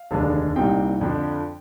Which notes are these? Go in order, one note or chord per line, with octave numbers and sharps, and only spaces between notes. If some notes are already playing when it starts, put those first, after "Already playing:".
Already playing: F5
F1 D#2 D3 G#3 D4
C2 A#2 G3 C4 D#4 G5
F2 D3 F3